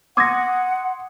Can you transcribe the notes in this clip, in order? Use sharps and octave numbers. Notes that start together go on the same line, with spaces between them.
F#5 C6 D6 D#6 G#6 A#6